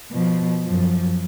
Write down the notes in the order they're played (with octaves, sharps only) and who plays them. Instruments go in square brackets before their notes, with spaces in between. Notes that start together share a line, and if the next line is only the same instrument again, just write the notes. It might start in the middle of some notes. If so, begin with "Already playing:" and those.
[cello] B2 F3
F#2 F3